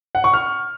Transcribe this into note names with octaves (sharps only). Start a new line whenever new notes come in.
F#5
C#6
F6